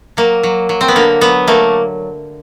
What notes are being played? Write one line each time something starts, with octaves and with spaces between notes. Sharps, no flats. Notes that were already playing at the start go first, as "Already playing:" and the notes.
F#3 A#3
F#3
F#3
C4
B3
D3 A#3
F#3 B3
A3 A#3